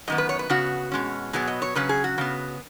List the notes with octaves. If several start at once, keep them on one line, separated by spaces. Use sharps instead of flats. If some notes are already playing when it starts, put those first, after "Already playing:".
F#2 D#3 B3 D#5
B4
C#5
B4
C#3 B3 F#4
B2 G#3 C#4
B2 F#3 B3 G#4
D#5
C#5
C#3 F#3 C#4 B4
G#4
F#4
C#3 B3